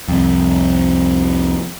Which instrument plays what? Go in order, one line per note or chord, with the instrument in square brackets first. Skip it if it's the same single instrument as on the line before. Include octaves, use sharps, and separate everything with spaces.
[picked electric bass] C2 F2